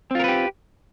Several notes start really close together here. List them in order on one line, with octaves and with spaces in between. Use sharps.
C4 F4 A#4 B4 G4